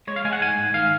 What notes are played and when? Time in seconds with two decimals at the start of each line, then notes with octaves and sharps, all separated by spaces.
0.07 G#3 C#5
0.16 F5
0.25 G#3 G#5
0.33 F#5
0.41 G#2 G#5
0.58 G#2
0.74 D#3 F5